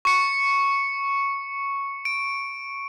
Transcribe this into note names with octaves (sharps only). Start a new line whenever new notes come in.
C#6 C#7
D7